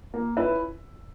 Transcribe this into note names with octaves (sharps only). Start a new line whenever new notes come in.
A#3
C#4 E4 B4 E5